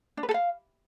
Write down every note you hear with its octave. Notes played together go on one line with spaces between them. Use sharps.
D4
B4
A4
F5